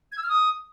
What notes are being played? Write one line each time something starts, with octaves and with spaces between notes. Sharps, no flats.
G#6
E6
F6
D#6